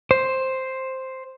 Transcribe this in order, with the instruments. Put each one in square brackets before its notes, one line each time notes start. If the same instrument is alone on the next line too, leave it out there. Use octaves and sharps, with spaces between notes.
[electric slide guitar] C5